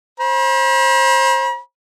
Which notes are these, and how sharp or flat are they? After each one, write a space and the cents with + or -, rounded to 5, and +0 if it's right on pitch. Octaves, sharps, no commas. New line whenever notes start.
C5 +25 B5 -45